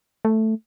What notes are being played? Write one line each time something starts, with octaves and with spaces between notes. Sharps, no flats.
A3